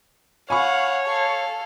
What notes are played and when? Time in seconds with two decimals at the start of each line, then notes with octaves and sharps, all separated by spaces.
0.50 C#5 F5 F#5 G#5 B5 C#6
1.06 A4 F5